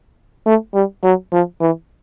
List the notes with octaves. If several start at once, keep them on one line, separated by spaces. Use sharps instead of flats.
A3
G3
F#3
F3
E3